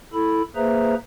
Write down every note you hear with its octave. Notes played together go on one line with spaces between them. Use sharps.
E4 A4 B5
A#3 G#4 B4 C5 E5 A#5